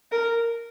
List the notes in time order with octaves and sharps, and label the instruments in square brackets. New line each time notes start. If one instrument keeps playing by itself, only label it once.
[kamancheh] A#4